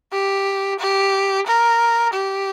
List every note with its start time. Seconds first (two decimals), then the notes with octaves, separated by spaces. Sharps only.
0.13 G4
0.79 G4
1.47 A#4
2.13 G4